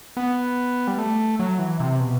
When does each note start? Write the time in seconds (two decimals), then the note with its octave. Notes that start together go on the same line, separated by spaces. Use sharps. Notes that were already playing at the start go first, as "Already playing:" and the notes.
0.17 B3
0.88 G3
0.99 A3
1.39 F#3
1.59 E3
1.80 C3
2.00 B2